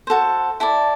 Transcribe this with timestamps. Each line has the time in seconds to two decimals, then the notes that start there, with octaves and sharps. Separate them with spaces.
0.07 F#4 A4 C5
0.60 E4 A4 D5